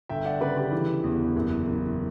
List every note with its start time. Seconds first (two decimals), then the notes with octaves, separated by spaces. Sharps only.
0.09 G1 E5 G5
0.25 D5 F#5
0.40 C#3 B4 D5
0.57 G4 B4
0.72 E3
1.04 E2
1.36 F#1
1.67 F#1